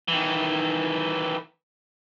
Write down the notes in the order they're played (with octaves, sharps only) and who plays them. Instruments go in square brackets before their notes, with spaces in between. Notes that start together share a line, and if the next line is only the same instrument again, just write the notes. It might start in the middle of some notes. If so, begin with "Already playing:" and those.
[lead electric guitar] D#3 E3